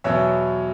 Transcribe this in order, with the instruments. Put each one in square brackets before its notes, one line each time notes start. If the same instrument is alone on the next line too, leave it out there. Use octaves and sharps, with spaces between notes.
[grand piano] E2 B2 F#3 C#5 E5